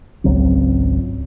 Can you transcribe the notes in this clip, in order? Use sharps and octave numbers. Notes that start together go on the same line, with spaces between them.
G#1 C#2 F#3 C4